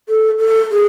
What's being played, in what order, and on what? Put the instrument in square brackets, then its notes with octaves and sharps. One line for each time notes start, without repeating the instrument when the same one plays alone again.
[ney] A4
A4
G#4